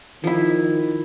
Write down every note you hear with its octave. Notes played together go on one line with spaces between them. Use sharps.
D#3 F3 E4